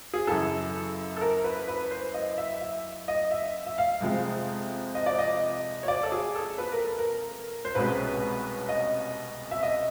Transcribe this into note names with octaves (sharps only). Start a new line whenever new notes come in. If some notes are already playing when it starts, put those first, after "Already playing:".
G#4
F#2 C#3 E3 A4
A4
A#4
B4
B4
C5
D#5
E5
E5
D#5
E5
E5
F5
F2 C3 F3 G#3
D#5
D5
D#5
C#5
D5
A4
G#4
A4
B4
A#4
A4
A#4
C5
C2 B2 G#3 C#4 B4
D#5
E5
D#5